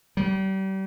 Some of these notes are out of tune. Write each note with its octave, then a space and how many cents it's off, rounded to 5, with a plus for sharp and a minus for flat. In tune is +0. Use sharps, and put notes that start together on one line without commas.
G3 -35